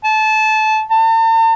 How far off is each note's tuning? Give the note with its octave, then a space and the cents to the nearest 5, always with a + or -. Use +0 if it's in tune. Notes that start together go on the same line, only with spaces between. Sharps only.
A5 -20
A5 +45